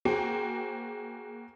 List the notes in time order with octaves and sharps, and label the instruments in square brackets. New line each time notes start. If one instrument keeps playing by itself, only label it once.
[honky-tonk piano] A#3 F#4 G#4 C5 G5